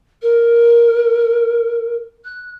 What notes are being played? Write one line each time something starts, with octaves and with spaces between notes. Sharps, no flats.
A#4
F#6